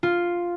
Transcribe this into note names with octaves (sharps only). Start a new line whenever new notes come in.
F4